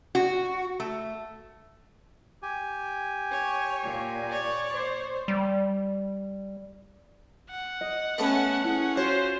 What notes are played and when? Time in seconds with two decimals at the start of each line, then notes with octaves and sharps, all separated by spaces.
0.15 F#4
0.80 A3
2.42 G4 G#5
3.31 C#5
3.84 A#2
4.29 C#5 D5
4.73 C5
5.28 G3
7.50 F#5
7.81 D#5
8.18 A3 B3 C#4 B4 A5
8.64 C#4 E4 G#4
8.97 F4 F#4 C5 C#5